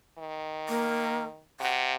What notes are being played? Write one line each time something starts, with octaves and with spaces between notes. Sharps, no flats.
D#3
A#3
C3 F#5